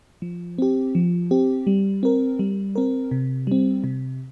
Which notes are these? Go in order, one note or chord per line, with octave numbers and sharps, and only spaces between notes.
F3
C4 G4
F3
C4 G4
G3
C4 A#4
G3
C4 A#4
C3
G3 C4
C3